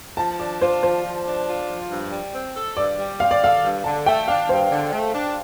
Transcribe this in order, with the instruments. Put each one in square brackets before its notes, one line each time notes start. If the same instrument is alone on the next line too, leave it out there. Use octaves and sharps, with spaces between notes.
[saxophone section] F3 [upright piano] A5
[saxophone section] D4 [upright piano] D5
[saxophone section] F4 [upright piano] C5
[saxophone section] F3 [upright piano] C5
[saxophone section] F3
D4
F4
F3
G2
G3
C4
A4
[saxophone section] G2 [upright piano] D5
[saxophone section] G3
[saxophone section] C4 [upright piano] F5
[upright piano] D5
[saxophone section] A4 [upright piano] F5
[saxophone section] G2
[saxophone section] D3 [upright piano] A5
[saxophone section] A3 [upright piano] G5
[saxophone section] D4 [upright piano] F5
[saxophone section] G2 [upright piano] C5
[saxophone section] D3
A3
D4